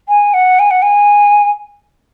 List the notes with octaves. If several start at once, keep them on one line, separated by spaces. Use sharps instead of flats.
G#5
F#5
G#5
F#5
G#5